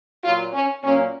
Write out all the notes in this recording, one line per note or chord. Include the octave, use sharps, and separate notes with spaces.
A#2 F#3 A#3 F4
C#4
A#2 F#3 A#3 C#4